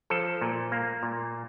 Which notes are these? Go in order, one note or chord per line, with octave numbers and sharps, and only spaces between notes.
F3 A4
A#2
A#3
A#2